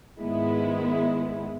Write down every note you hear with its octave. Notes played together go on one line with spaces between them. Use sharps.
G#2 D#3 G#3 B3 E4